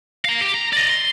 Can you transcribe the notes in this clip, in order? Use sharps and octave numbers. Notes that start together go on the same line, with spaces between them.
F5 A#5
G4
A#5
D5 D#5
C6